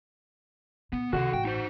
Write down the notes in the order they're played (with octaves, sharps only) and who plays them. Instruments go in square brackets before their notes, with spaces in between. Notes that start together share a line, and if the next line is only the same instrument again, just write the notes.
[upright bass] A#2 [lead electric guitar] B3
[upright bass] C#2 C3 [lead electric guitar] D#3 A4 [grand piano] F#4
[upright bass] A1 [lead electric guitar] G5
[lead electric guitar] D#4 C5